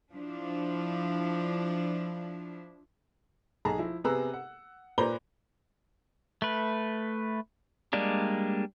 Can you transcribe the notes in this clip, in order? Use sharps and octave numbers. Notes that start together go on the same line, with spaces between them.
F3 D4 E4
B1 G#4 A5 A#5
F3 E4
C3 B3 G#4 A#5 E6 F#6
F#5
A#2 B4 C5 D5 A#5 G7
A3 B4
G3 G#3 A#3 D4